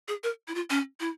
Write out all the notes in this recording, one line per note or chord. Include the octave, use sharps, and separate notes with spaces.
G#4
A#4
E4
F4
C#4
E4